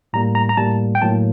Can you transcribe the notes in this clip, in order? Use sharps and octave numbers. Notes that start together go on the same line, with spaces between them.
A2 G3 A#3 A#5
A#5
A#5
A2 G3 A#3 A5
G5
A2 F#3 A#3 A5